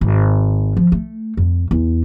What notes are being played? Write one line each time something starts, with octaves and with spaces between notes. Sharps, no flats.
G#1
F3
A3
F2
E2